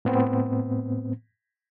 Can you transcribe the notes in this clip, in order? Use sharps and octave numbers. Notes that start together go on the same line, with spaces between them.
A2 B3 C4